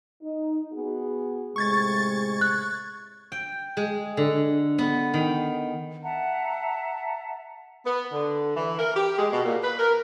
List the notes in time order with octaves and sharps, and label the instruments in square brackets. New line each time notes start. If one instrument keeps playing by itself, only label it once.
[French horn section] D#4
B3 F#4 G#4
[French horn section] A2 C3 G#3 [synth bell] C#6 G#6 A6
[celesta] F#6
[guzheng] G5
G#3
D3
B3
D#3
[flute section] E5 F#5 A5 A#5
[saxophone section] B3
D3
E3
A#4
G4
G#3
B2
A#2
B4
A#4